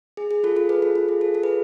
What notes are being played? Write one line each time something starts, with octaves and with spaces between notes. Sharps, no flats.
G#4
G#4
F4 A4
F4 A4
G#4 B4
F4 A4
F4
G#4
F4 A4
F4 A4
G#4 B4